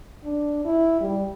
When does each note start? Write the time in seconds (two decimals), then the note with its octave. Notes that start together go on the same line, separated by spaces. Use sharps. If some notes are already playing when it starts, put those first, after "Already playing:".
0.25 D4
0.65 E4
1.00 G3